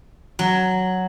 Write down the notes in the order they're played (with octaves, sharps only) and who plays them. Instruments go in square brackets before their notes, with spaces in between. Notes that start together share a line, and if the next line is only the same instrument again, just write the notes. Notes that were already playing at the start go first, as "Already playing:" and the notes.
[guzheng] F#3